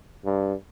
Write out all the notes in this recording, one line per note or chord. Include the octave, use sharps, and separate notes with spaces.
G2